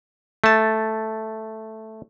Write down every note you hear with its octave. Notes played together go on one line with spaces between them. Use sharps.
A3 A5